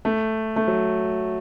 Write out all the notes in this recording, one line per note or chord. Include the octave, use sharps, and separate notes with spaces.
A3
A3
F#3